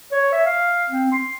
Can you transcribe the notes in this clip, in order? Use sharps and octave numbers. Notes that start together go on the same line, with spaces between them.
C#5
E5
F5
C4
C6